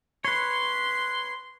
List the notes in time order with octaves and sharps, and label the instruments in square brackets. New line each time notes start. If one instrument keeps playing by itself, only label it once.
[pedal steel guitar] B4 C#5 [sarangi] C6